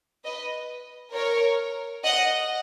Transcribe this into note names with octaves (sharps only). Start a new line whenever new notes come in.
B4 D#5
A#4 C#5
D#5 F#5